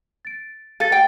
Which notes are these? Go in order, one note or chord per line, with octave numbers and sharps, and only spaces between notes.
A6 D7
A4 F5 A6
G5